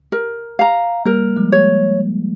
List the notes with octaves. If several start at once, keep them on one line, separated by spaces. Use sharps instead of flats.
A#4
F5 A#5
G3 A#3 A#4
F3 G#3
C#5